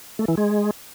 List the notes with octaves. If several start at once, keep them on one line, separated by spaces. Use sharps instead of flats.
A3
E3
G#3